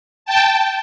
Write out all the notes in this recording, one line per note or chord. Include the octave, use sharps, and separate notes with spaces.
G5 A5